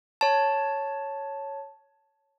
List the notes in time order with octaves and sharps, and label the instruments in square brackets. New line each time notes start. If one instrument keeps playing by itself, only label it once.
[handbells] C#5 A5